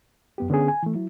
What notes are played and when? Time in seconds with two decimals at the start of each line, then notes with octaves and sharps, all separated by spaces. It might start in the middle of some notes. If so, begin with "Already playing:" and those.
0.38 F#2 B3 G4
0.50 D3 B3 C#4 G#4
0.68 G#5
0.83 E3 A3
0.94 F#3 E4